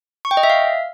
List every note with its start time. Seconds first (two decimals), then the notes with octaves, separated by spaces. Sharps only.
0.25 C#6
0.31 G5
0.37 D#5
0.43 E5
0.50 F5